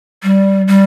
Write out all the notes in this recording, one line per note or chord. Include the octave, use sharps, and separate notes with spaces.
G3
G3